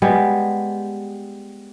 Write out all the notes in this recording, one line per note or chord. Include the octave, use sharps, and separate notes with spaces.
G3 G#3 B3